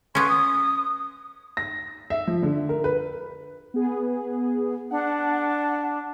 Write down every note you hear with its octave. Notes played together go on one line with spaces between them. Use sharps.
B3 C#4 C6
D#6
A#6
E5
F3
D3
A#4
B4
B3 G#4
D4 F#5